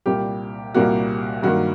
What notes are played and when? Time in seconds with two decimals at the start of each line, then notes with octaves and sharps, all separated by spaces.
0.06 C2 A#2 G3 A#3 G4
0.74 C2 A#2 G3 A#3 F#4
1.43 G2 D#3 F#3 A#3 F#4